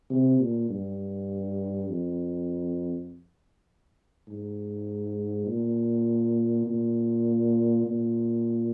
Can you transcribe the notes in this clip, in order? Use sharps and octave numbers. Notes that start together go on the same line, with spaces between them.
C3
A#2
G2
F2
G#2
A#2
A#2
A#2